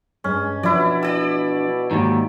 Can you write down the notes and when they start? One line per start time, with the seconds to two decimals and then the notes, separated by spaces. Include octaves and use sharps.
0.24 G2 G#3 C#4
0.63 B2 F3 D4 E4 D5 E5
1.03 D5 E6
1.91 D#2 G#2 D#3 F#3 G4